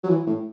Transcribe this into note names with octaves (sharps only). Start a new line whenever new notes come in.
F#3
E3
A2